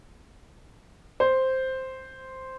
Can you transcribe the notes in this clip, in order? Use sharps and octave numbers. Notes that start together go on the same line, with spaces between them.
C5